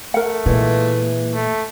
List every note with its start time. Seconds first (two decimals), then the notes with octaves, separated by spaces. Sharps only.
0.14 A3 A#4 F#5
0.46 A#2 E3 G#3
1.34 A3